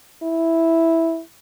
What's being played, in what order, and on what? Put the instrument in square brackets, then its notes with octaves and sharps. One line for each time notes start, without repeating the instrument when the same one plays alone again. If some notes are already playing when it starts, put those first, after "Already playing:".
[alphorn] E4